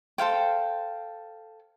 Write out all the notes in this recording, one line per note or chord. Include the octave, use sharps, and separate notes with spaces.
A4 C5 F5 G5